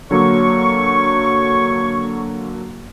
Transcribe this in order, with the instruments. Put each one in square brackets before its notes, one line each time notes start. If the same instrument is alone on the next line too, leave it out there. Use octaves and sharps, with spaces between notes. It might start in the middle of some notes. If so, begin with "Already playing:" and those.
[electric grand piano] D3 F#3 A#3 [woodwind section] C#5 C#6